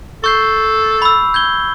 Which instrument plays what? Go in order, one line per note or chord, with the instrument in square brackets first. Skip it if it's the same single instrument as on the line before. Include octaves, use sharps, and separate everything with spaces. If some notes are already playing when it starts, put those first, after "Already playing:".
[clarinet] A4 [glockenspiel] C#6 G6 C7
[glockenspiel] B5 E6
G6 G#6 G7